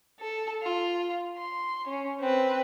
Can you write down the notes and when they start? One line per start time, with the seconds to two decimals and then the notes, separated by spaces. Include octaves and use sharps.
0.20 A4
0.63 F4
1.36 C6
1.88 C#4
2.20 C4 B4